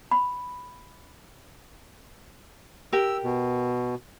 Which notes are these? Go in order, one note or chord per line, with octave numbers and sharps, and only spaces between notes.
B5
G4 A#4 E6
B2